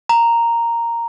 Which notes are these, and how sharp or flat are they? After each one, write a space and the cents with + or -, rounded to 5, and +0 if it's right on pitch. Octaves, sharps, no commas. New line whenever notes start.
A#5 -5